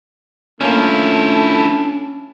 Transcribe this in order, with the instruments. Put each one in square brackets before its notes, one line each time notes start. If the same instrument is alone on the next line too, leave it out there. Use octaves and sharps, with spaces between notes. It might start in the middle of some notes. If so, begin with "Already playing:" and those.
[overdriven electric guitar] F3 E4 [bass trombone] A3 [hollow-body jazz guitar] A#3 C#4 [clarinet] D4